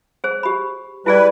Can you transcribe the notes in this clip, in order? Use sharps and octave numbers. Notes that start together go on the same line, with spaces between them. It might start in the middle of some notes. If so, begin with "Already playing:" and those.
G#4 C5
G4 B5
G3 E4 G#4 B4 D5